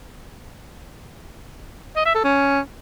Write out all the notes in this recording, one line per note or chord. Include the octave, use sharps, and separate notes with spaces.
D#5
E5
A4
C#4